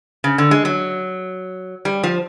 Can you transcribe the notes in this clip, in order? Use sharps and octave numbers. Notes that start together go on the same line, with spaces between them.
C#3
D3
G#3
F#3
G3
F3